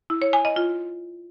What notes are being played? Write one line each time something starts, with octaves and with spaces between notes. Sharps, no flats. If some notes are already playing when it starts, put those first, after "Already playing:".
E4
C#5
G#5
D#5
F4